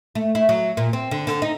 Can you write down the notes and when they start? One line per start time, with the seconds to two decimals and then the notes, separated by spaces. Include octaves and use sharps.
0.15 A3
0.35 E4
0.49 F#3
0.77 A#2
0.93 C4
1.11 D3
1.27 D3
1.42 D#4